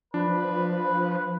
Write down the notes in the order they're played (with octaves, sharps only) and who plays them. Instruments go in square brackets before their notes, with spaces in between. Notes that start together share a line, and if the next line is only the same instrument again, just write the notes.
[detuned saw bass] F3 [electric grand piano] D4 [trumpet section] B4